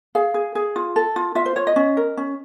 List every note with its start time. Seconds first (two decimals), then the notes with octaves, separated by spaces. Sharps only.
0.15 G#4 F5
0.34 G#4
0.55 G#4
0.76 F4
0.96 A4
1.16 F4
1.35 F4 E5
1.46 C5
1.56 F4 C#5
1.67 D#5
1.76 C#4
1.97 A#4
2.17 C#4